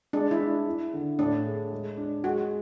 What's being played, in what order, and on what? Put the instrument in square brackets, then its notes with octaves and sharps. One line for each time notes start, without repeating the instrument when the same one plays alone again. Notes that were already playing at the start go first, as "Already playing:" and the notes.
[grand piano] G#3 [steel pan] D4
[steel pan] E4
[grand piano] D4
E4
D3
[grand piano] A2 [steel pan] D4
[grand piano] G#4
G#3
D4
[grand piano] G#3 [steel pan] F#4